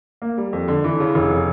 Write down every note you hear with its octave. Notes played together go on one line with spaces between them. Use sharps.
A#3
G3
F2
D3
E3
C#3
F1